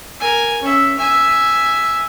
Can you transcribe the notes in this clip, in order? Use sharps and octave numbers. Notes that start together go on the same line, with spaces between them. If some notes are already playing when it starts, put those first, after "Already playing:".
A#4 G#5
C#4 E5
E5 G#5